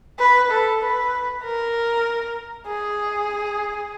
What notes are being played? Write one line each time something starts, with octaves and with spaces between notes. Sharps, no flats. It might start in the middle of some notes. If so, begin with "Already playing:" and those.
B4
A4
B4
A#4
G#4